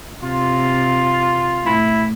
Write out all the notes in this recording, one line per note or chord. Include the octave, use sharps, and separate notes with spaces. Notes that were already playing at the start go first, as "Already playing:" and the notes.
C3 F4
A2 E4